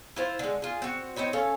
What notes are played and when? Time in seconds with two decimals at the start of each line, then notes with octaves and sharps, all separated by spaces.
0.16 E4 F4 C5
0.39 D3 G#3
0.62 F4 G#4
0.82 C4 F#4
1.16 C4 D#4 E4 C#5
1.33 C#4 A4 C#5 F5